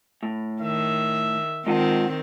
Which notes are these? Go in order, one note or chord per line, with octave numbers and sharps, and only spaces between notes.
A2
D#3 E5
D#3 G#3 C4 F4 F#5